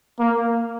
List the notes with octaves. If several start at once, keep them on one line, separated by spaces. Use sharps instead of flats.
A#3